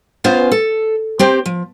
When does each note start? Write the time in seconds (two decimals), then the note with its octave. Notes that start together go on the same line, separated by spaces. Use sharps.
0.24 B3 C#4 F4 C5 F5 G#5
0.52 A4
1.19 C4 G4 C5
1.46 F3